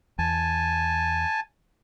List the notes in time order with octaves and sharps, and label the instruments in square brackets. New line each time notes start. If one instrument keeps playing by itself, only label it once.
[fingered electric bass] E2 [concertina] G#5 A5